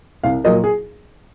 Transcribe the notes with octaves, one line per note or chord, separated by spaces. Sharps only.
C2 F5
A#2 F#3 A#3 D#5
G#4